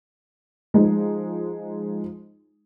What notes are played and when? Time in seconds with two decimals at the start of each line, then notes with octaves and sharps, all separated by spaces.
0.74 F3 G#3 D#4